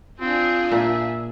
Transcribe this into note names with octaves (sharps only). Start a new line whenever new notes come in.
C4 D4 F4 G#4
A#2 E5